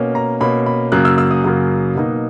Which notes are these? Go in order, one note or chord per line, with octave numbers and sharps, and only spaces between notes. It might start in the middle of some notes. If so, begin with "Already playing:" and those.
Already playing: B2 A#3 C#4
A#5
B2 A#3 C#4 B5
B5
F#2 C#3 F#3 A#3 F#6
E6
E6
D#6
F#2 C#3 F#3 A#3
B2 F#3 A#3 D#4